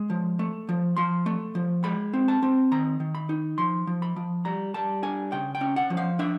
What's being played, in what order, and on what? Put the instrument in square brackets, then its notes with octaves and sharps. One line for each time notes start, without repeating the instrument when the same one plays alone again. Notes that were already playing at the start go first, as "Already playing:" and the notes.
Already playing: [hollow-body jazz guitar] G#3
F3
A3
F3
F3 C6
A3
F3
G#3 B5
C4
A5
C4
D#3 A#5
D#3
B5
D#4
F3 C6
F3
B5
F3
G3 A#5
G3 A5
D4 G#5
C#3 G5
G5
C#4
F#5
F3
F5
D4 E5